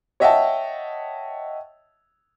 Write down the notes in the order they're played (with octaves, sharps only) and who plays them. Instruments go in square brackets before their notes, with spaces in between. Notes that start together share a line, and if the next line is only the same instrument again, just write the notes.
[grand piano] C#5 D#5 E5 F#5 G5 A5